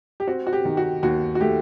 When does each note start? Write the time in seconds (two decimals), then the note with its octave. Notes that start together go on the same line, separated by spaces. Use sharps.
0.20 G4
0.27 C4 F#4
0.47 F#4
0.53 G4
0.65 D#3
0.77 F#4
1.03 D#2 F#4
1.35 F#4
1.40 A3 G4